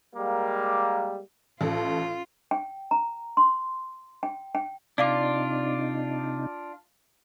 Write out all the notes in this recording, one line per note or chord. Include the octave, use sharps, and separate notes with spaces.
G3 G#3 A#3
A1 F4 A4
G5
A#5
C6
G5
G5
C3 D4 D#4 F4 D5 F5 D6